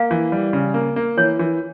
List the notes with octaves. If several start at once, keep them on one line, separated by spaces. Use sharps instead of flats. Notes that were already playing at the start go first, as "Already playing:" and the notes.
Already playing: A#3 F5
E3
G3
C#3
A#3
A#3
E3 C#5
E3